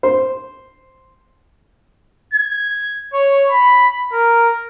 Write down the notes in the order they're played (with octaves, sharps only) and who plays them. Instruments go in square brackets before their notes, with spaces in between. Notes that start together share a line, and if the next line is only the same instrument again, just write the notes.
[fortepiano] C5
[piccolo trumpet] G#6
C#5
B5
A#4